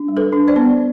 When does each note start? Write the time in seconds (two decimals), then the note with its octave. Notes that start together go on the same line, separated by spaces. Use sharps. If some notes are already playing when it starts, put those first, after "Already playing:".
Already playing: D4
0.08 G3
0.17 A4 B4
0.32 D4
0.48 C5 D5
0.56 B3